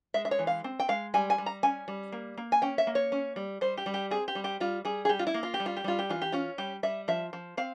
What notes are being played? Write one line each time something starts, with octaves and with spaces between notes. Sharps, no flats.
G#3 E5
E5
C#5
E3
F5
C4
G5
G#3 F5
G3 G#5
G#5
G3
A#5
C#4 G#5
G3
A#3
A#3
G#5
C#4 G5
E5
A#3
C#5
C#4
G3
G3 C5
G4
G3
G4
C4 G#4
G4
G3
G4
G3 F4
G3 G#4
G#4
G3 G4
F4
E4
A#3
F4
G4
G3
F4
G4
G3 F4
G4
E3 F4
G4
C#4 F4
G3 G4
G3 E5
F3 E5
F3
C4 F5